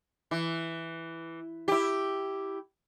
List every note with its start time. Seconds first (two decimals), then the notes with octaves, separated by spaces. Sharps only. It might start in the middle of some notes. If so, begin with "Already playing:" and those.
0.31 E3
1.68 E4 G4